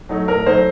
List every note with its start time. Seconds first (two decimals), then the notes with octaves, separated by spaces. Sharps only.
0.09 F#3 A3 D#4
0.28 A2 A#4
0.46 F#3 A3 D#4 C5